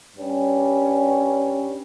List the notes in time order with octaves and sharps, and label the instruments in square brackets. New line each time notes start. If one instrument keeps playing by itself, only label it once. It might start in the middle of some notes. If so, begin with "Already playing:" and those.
[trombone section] G2 G3 C#4